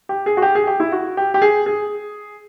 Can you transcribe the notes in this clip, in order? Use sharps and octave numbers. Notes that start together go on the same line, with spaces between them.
G4
G#4
F#4
G4
G#4
G4
E4
F#4
G4
G4
G#4
G#4